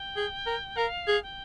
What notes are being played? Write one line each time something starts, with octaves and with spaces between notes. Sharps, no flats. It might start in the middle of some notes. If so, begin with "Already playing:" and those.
Already playing: G5
G#4
A#4
A#4 F5
G#4
G5